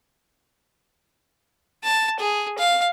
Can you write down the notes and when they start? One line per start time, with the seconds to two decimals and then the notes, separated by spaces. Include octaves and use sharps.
1.83 A5
2.19 G#4
2.58 F5